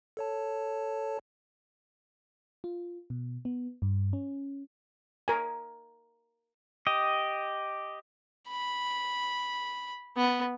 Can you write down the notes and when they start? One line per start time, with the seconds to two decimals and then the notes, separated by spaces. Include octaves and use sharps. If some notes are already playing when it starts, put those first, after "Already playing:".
0.17 A4 C#5 A5
2.64 F4
3.10 B2
3.45 B3
3.82 G2
4.13 C#4
5.28 A#4 G#5
6.87 G4 D#5
8.49 B5
10.17 B3